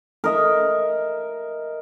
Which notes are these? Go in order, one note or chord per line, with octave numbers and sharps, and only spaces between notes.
A#4 D#5 E5